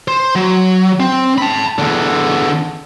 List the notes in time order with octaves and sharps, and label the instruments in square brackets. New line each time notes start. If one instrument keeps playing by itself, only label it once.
[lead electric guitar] C5
F#3
C4
A5 B5
E2 D3